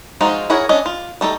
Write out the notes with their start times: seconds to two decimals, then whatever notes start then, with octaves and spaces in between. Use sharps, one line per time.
0.21 F3 G#3 D#4 F4 F#4
0.50 E4 G#4 A#4 C#5 F#5
0.69 C#4 D4 D#5
0.86 F4
1.21 G3 A3 D#4 A4